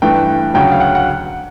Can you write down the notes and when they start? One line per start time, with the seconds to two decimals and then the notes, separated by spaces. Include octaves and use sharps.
0.02 G2 E3 A3 G5
0.54 D2 C#3 F#3 G5
0.72 F5
0.80 F#5
0.95 F#5